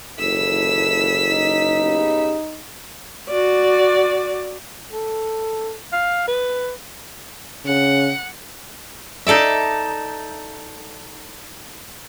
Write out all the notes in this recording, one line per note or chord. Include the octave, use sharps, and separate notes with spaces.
F#1 D#2 E3 A4 E6 B6
D#4
C#3 B3 G4
F#4 D5
A4
F5
B4
C#3 F#5
D#4 A4 D5 E5